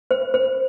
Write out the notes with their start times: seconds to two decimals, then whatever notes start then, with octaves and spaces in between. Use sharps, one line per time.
0.11 C5
0.34 C5